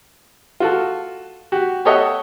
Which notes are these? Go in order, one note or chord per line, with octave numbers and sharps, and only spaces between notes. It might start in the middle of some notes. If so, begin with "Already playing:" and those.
F4 F#4 A4
F#4 G4
G4 A4 C#5 D#5 E5 F#5